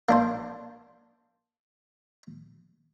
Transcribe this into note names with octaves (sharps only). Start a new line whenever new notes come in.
A#3 D4 C5